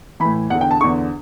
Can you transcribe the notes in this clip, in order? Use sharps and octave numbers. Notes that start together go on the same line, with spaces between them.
E3 B5
A2
E2 D3 F#5
G5
A5
E2 D3 C#6